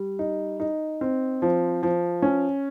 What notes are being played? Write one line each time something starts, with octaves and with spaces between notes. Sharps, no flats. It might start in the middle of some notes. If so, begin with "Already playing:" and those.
Already playing: G3
D#4
D#4
C4
F3
F3
C#4